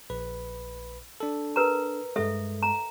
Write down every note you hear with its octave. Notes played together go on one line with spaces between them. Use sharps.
A#1 B4 B5
D4 A4
A#4 B4 A#5
G2 G#3 A4 E5
A#5